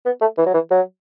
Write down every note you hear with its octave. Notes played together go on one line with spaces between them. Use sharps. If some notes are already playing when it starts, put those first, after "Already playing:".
B3
A3
E3
F#3
E3
F#3